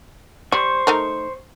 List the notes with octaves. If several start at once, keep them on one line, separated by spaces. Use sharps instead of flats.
G3 C5 C#6
A3 D#4 A#4